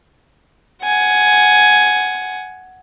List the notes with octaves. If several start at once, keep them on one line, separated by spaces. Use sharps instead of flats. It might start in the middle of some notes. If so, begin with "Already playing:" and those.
F#5 G#5